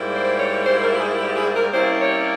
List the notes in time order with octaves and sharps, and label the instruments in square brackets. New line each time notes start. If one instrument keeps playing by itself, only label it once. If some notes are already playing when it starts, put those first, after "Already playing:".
Already playing: [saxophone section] G#2 G3 A#3 E4
C5
C#5
C5
A#4
G#4
G4
G#4
A#4
C3 G3 A#3 C#4 E4 C5
C#5